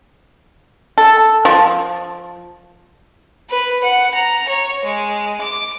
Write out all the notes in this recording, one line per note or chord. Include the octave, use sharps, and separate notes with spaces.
A4
F3
B4
F#5
A#5
C#5
G#3
D6